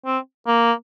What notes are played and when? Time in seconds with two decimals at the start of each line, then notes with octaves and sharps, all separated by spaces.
0.06 C4
0.47 A#3